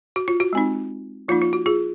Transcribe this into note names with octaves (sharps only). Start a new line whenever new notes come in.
F#4
F4
F#4
G#3 C4 D#4
F3 A#3 D#4 F4
F4
F#4
F4 G#4